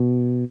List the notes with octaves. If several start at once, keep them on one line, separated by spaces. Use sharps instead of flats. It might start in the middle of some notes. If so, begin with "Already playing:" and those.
Already playing: B2